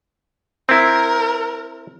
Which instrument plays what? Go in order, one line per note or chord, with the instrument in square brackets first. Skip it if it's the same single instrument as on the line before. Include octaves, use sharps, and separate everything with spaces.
[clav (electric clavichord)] C4 E4 [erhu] A#4